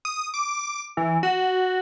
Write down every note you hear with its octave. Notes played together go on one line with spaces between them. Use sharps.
D#6
D6
E3
F#4